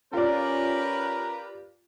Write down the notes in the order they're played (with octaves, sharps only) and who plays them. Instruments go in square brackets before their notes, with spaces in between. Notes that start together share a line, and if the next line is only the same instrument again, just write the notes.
[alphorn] C#4 [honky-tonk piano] F4 D5 [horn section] G4 B4 [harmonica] A#4